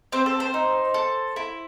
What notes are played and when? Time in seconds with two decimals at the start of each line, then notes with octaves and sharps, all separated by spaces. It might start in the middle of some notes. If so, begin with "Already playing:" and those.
0.12 C4 C5
0.26 A4
0.40 C5
0.54 D#4
0.94 A4
1.36 E4